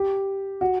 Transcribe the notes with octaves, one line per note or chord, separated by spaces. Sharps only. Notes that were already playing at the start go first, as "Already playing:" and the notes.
Already playing: G4
F#4